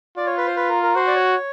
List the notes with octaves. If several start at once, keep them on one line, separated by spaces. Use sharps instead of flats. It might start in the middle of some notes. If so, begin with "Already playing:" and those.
F4 D5
C#5
B4
C5
B4
A#4
A#4
F#4 C5
D5
C#5